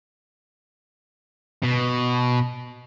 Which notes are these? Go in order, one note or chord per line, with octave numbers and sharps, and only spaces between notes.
B2